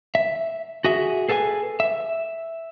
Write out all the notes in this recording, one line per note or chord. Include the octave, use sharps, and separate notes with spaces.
E5
F#4 G#4 E5
G#4 A4 B4 E5 G#5
E5